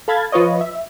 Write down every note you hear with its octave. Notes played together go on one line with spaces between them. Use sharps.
A4 F5 B5 G#6 A6
F3 F4 B4 C#5 D#5
E5